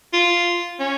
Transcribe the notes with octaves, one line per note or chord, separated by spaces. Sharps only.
F4
C#4